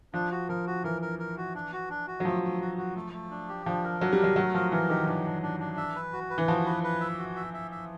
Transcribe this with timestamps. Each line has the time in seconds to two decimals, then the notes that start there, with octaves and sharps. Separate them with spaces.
0.14 F3 D4
0.31 F#4
0.49 F3 A#4
0.66 F#4
0.84 E3 A#4
1.02 A#4
1.19 A#4
1.37 F#4
1.55 D4
1.73 F#4
1.90 D4
2.08 F#4
2.20 F#3
2.25 F3 A3
2.43 A3
2.61 F#4
2.78 F#4
2.96 A3
3.13 A3
3.31 D4
3.49 G4
3.66 F3 D4
3.84 A#4
4.01 F#3 D4
4.13 G3
4.19 F#3 A#4
4.36 F#3 A3
4.54 F3 A#4
4.72 E3 A#4
4.89 D#3 G4
5.07 E3 D4
5.25 D4
5.42 D4
5.60 D4
5.77 E5
5.95 B4
6.13 F#4
6.30 B4
6.38 E3
6.48 F3 F#4
6.65 B4
6.84 B4
7.01 E5
7.18 F#4
7.36 E5
7.54 E5
7.71 E5